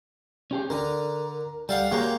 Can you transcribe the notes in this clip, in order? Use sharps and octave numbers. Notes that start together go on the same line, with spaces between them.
C#4 G4 G#4
D3 A#4
G3 A4 F5 F#5
G#3 A#3 F#4 G4 C#5